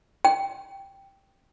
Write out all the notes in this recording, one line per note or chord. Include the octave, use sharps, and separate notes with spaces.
G5